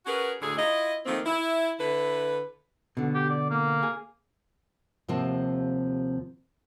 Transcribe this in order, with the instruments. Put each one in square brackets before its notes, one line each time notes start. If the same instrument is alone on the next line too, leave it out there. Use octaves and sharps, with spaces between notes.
[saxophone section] C#4 F#4 G#4 A#4 B4
D2 A2 D3 G#4
E4 F4 D#5
D#3 F3 A3 A#3 C4
E4
D3 E4 B4
[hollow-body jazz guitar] B2 D3
[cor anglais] G4
D5
A#3
[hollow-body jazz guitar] G#4
[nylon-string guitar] D#2 C3 F3 C4 F#4 A5